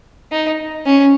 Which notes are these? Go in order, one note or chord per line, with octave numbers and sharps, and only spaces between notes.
D#4
C#4